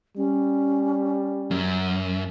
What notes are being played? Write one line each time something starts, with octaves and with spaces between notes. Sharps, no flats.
G3 C#4
F#2